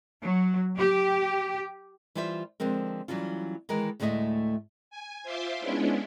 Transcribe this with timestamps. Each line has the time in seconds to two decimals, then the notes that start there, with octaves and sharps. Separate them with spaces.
0.21 F#3
0.77 G4
2.15 E3 G3 F4 C5 E5
2.60 D3 F3 G#3 C4 A#4
3.08 E3 F#3 G3 C#4 F4
3.69 D#3 E3 G#3 A#4
4.00 D2 A2 G#3 A3 D#5 E5
4.90 G#5
5.23 F4 C5 E5 C6 D6
5.59 G#3 B3 C#4 D4 E4